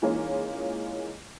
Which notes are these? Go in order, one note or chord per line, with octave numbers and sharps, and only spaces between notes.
E3 G#3 A#3 C#4 D#4 F4